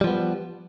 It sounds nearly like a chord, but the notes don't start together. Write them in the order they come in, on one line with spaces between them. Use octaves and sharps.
G3 F3 B3